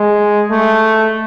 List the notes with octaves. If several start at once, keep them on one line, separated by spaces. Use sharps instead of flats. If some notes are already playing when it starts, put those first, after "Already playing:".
Already playing: G#3
A3